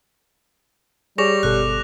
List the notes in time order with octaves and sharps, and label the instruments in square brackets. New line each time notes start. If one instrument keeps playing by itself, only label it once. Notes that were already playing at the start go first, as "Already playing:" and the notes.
[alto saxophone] G3 [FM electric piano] G#4 C#5 C#6 [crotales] D6 A#6 F7
[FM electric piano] G1 B2 A4 [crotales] F#6